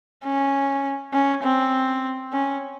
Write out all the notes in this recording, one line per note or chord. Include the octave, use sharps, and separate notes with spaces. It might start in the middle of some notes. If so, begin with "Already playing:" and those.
C#4
C#4
C4
C#4